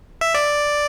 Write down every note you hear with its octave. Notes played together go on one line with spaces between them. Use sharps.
E5
D5